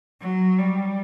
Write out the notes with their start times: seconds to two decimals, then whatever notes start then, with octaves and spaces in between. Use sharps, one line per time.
0.21 F#3
0.59 G3